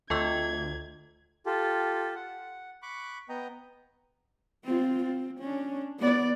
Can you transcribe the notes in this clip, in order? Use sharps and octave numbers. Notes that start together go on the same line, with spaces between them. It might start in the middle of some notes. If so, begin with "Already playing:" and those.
D2 A3 C4 F4 A4 D#5 G#6
F4 G4 A4
F#5
B5 C#6 D6 F#6
B3 D#5 G5 A#5
C4 F4
C4
C#4 D4
B3 D5